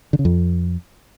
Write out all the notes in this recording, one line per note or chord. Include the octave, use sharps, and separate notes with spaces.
D3
C#3
F2